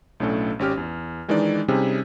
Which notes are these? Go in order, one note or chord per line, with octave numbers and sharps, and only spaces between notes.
B1 A2 A3 C#4 D4 A4
G#1 C#4 G4 F6
E2
D#3 E3 G#3 D4 D#4 D5
C3 G3 C4 C#4 D#4 G#4